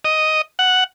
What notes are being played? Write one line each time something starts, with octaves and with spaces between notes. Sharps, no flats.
D#5
F#5